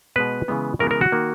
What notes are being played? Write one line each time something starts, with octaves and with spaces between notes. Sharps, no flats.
B2 G#3 B3 B4
C#3 E3 G#3 B3
C#3 E3 G#3 B3 A#4
A#4
F#4
D#3 A#3